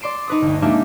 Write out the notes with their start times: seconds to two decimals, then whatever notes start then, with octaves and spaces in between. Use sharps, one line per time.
0.01 D5 C6 C7 D7 E7
0.28 D#4 B4 D#6
0.42 G1 D2
0.62 G#3 A#3 D4 D#4 G4 E5